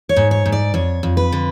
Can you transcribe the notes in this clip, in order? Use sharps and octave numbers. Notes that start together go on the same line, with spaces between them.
C#5
G#2
C#5
G#2
D5
F2 C#5
F2
B4
D3